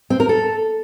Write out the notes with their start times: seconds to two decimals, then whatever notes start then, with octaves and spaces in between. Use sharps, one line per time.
0.10 C4
0.20 A#4
0.29 A4